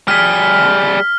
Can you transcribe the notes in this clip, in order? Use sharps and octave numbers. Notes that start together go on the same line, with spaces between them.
G3 G#4 F6 B6